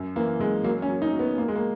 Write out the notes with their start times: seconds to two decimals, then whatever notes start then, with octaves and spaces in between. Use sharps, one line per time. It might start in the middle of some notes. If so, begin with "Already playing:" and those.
Already playing: F#2
0.16 E3 A#3
0.39 F#2 G#3
0.64 F#3 A#3
0.82 C#4
0.89 F#3
1.02 D#4
1.13 F#3
1.19 B3
1.38 A#2 A#3
1.48 G#3
1.56 A#3